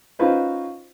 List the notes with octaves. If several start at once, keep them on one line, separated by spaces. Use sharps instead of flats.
C#4 D#4 F4 F#4 B4 C5